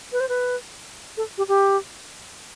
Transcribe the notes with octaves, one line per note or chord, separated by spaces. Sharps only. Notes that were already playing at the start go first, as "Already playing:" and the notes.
B4
C5
B4
A4
G4
G4